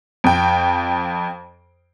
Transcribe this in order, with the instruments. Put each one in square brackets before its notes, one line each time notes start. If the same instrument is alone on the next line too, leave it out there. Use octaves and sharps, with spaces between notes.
[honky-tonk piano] F2 G5